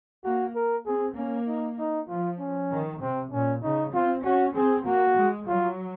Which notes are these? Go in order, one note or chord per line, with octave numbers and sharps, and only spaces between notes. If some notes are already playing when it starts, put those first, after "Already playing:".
A#3 F#4
A#4
C4 G#4
A#3 C#4
D#4
D#4
F3 F4
C#4
D#3
C3 C4
A#2 C#4
C#3 D#4
C4 F4
C#4 F#4
C4 G#4
A#3 F#4
G#3
F#3 F4